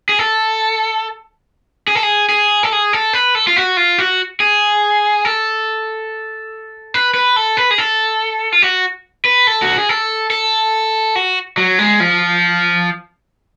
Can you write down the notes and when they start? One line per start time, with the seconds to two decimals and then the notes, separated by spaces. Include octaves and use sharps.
0.09 G#4
0.19 A4
1.88 G#4
1.95 A4
2.03 G#4
2.29 G#4
2.63 A4
2.72 G#4
2.93 A4
3.13 B4
3.35 A4
3.47 F4
3.56 F#4
3.77 F4
3.98 F#4
4.40 G#4
5.25 A4
6.94 B4
7.14 B4
7.36 A4
7.57 B4
7.71 G#4
7.78 A4
8.52 F4
8.62 F#4
9.25 B4
9.47 A4
9.62 F#4
9.76 G#4
9.89 A4
10.30 A4
11.16 F#4
11.57 F#3
11.79 G#3
12.00 F3